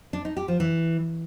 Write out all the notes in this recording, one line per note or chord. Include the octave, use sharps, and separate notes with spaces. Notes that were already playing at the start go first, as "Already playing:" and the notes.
D4
D#4
G4
F3
E3